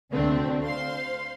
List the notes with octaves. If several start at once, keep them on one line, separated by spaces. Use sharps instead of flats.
D2 D3 A3 C4 D4
C5 F5 C6